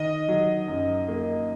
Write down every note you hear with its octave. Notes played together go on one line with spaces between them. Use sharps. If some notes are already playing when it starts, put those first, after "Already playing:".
Already playing: D#3 D#5
F#3
F#2
A#3